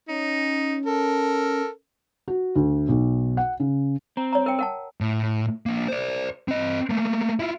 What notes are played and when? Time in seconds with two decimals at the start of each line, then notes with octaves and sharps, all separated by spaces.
0.08 C#4 D#4
0.86 A4 A#4
2.28 F#4
2.56 D2
2.89 B1
3.37 F#5
3.60 C#3
4.17 C4 A#5
4.33 C#5 A#5
4.46 A#4 G5
4.59 A#4 F#5 A5
5.01 A2
5.66 A#3 D4
5.88 C5 D5
6.48 C4 D#5
6.90 A3 A#3
7.39 E4 F4